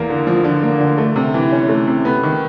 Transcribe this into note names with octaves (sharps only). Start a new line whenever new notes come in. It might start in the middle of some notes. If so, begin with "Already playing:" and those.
Already playing: E2 A#3
D3
F3
D3
A#3
D3
A3
C3
E3
C#4
A3
C3
B3
D#3